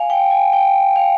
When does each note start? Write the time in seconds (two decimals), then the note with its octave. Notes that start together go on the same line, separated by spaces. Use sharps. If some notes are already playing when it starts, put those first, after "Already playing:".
Already playing: F5 G#5
0.10 G5
0.31 G#5
0.53 G5
0.96 F5